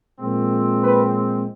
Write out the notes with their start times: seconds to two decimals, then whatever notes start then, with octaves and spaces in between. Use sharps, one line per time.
0.19 A#2 F3 G#3 C4
0.82 B4